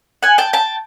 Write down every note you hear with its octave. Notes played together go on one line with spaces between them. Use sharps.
F#5 G#5
G5 A5
G5 A5